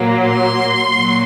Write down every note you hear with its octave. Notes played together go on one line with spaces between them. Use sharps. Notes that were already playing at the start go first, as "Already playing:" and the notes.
Already playing: A#2 F#3 A#3
C6
A#2 F#3